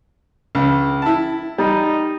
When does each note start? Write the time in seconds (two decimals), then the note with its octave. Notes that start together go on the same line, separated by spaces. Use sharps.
0.55 C#2
1.02 E4 A5
1.58 G3 D#4